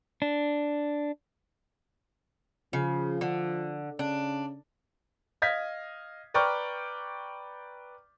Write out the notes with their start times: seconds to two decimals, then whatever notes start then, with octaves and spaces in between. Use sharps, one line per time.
0.22 D4
2.73 C#3 F3
3.21 D3
3.99 C#3 D4
5.42 D#5 F5 G#6 B6
6.34 B4 D5 G5 A#5 C#6 F6